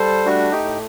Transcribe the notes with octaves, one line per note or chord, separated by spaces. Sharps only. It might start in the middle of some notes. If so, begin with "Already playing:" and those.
Already playing: G3 A4 C5
A3 D4 F#4
D#4 G4
A2